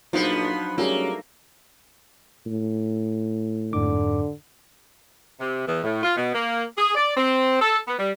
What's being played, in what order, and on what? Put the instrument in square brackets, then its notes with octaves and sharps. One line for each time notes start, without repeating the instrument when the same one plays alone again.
[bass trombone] A#1 [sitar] F3 B3 [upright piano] F#3 [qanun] D4 D#4 F5
[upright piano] F#3 G3 G#4 [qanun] A3 [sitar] A#3 [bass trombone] C#4
[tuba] A2
[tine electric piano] F2 G#2 D6 [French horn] D3
[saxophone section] C3
E2
A2
F4
B2
A#3
G#4
D5
C4
A4
B3
G3